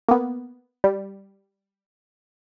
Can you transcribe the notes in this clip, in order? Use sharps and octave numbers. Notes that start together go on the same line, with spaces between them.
A#3 B3
G3